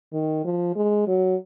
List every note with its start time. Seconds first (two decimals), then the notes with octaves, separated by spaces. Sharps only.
0.13 D#3
0.45 F3
0.76 G#3
1.07 F#3